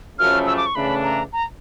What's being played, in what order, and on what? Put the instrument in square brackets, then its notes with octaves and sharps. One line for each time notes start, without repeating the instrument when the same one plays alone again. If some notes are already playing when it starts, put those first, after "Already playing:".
[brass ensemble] F#2 C#3 F3 A3 [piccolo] F6
[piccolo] E6
D6
C#6
[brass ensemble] C#3 E3 A3 D4 [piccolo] B5
[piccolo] A#5
A#5